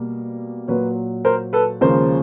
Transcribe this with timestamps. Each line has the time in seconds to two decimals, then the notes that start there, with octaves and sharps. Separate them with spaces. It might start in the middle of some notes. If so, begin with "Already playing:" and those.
Already playing: B2 G3 A#3
0.68 A#2 F#3 A#3 B4 C#5
1.25 A#4 C5
1.53 A4 B4
1.81 D#2 C#3 F3 G#3 A#4 C5